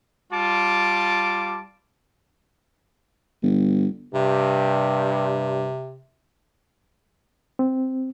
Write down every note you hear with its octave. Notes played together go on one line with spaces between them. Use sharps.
G3 F4 A5 D6
G1
G2 C3
C4